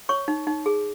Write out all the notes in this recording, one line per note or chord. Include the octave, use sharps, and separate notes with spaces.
C#5 C#6
D#4
D#4
G#4